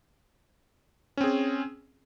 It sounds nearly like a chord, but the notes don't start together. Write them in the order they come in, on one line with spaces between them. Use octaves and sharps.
C#4 C4 G#4